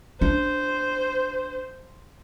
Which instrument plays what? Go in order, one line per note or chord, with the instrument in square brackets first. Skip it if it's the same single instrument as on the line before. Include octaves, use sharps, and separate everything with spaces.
[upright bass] D4 [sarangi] C5